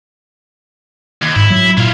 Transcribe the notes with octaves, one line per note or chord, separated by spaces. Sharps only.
D#2
G#2 E4
F#3
A#2 E4 F5